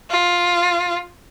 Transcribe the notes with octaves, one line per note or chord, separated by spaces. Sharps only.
F4